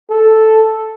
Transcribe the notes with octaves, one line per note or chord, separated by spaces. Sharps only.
A4